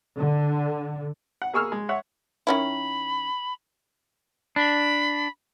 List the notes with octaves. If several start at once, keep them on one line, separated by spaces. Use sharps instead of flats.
D3
F#5
A#3 G#4 C#6 E6 F6
G#3
C#5 E5 F#5
D#3 C#4 E4 B5
D4 B5